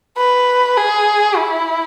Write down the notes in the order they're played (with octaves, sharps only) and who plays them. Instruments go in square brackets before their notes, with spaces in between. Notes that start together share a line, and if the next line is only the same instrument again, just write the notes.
[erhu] B4
G#4
E4